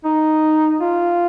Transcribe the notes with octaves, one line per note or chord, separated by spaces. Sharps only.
D#4
F4